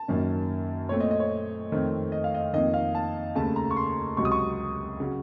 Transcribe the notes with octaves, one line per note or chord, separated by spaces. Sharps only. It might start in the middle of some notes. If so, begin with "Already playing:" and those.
Already playing: A5
F#2 D#3 A#3 C#4
A#2 A3 C4 C#5
D#5
D#5
C#5
F2 D#3 A3 C4
D#5
F5
D#5
F2 D#3 A#3 D#4 D#5
F5
A5
D#2 C#3 A3 A5
A#5
C#6
C6
C#2 C3 F#3 C#6
D#6
C#6
C#3 F#3